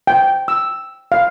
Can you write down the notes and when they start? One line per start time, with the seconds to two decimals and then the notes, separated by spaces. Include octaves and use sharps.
0.07 G5
0.48 E6
1.12 F5